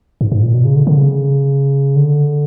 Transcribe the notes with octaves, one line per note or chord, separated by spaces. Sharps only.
G#2
G#2
A#2
B2
C#3
D3
D3
C#3
D3